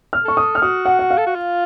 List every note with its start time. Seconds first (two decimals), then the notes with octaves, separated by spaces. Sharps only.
0.13 F6
0.25 A4 C#6
0.37 D#6
0.55 F6
0.62 F#4 D#6
0.86 F#5
0.99 F#5
1.11 F5
1.18 A4
1.26 F#4
1.35 F4